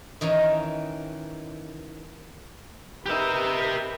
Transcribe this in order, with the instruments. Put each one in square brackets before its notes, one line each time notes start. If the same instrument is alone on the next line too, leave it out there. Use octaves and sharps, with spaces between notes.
[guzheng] D#3 E3 C#4 D#4
[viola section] D#4 A#4 B4 [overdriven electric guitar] G4 E5